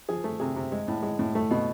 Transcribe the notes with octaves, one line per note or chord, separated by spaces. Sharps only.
F3 G#4
A3
C3 G#4
C3
G#3
A2
G#3
A2
A3
B2